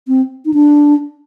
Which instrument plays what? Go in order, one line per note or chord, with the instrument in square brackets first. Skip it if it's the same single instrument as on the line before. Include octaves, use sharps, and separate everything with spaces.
[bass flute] C4
D#4
D4